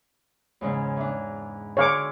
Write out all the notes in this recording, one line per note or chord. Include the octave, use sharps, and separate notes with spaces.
E2 G#2 C#3
E3 D4
D3 G#4 C#5 F5 D6